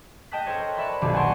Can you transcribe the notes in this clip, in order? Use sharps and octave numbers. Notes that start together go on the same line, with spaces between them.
D#5 G5 A5 D#6 F#6 B6
A4 A#4 C5 C#5
D5 E5 A5 B5 C#6 F#6
D#1 B1 C4 D6
F#5 G#5 A5 C6 C#6 D7